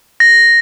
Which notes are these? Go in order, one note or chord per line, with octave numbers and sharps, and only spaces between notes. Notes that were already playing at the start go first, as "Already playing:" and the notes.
A#6